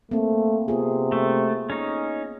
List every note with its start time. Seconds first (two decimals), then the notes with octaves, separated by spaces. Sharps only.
0.11 A3 A#3 C4
0.68 C3 B3 F4 G#4
1.12 A3
1.70 C#4 D#4